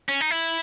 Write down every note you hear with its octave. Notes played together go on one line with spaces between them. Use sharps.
C#4
D#4
E4